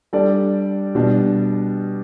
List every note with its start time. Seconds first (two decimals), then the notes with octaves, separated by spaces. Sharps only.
0.13 G3 D4 A4 D5
0.95 B2 G3 D4